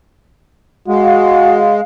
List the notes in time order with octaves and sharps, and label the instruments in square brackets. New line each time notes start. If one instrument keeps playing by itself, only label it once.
[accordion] G#3 [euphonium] F#4 [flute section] F5